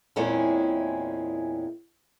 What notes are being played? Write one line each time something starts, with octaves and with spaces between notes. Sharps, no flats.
E2 A#2 G#3 C4 C#4 E4